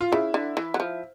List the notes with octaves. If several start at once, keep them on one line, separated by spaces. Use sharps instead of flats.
F4
C#3 E4
D3
E3
F#3
F3